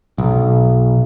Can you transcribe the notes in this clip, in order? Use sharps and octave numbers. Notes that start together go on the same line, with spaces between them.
B1